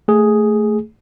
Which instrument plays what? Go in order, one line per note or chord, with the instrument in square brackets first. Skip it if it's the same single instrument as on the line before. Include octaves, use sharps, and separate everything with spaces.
[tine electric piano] A3 G#4